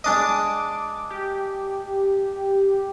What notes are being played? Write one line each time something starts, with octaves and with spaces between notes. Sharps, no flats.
G#3 D4 D#5 D6
G4